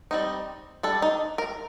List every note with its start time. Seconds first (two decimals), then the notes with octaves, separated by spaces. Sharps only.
0.11 G3 C4 D#4
0.83 G3 D4 A4
1.02 D#4
1.38 A#4